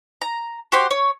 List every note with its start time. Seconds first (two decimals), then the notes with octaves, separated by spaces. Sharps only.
0.21 A#5
0.72 F#4 G4 C5 C6
0.91 C#5